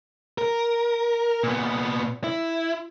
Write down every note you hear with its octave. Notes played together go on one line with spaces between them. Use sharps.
A#4
A#2 B3
E4